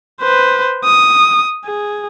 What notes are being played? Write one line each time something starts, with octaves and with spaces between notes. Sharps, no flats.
B4 C5
D#6
G#4